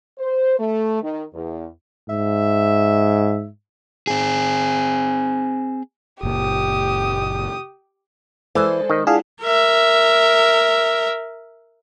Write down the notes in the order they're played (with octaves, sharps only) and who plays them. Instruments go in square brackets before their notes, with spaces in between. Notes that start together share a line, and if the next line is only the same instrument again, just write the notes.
[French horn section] C5
A3
D#3
E2
[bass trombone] G#2 [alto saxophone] E5
[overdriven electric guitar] C4 G#4
[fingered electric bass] F#1 A#2 [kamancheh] G4 D#6
[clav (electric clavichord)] E3 [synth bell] G#3 A4 [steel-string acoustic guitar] C5 D5 G#5
[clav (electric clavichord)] D#3 D#5
[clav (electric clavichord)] D4 [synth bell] E4 F4 F#5 [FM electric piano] G#4 F5
[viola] A#4 E5